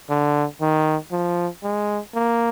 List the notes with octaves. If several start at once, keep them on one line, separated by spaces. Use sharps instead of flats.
D3
D#3
F3
G#3
A#3